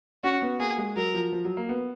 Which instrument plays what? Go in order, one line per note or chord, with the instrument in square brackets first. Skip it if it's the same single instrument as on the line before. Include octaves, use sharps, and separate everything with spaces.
[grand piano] C#4 [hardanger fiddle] F#4
[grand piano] B3
[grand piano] A#3 [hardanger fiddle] G#4
[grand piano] G#3
[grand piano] F#3 [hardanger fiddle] A#4
[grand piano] F3
F3
F#3
A#3
B3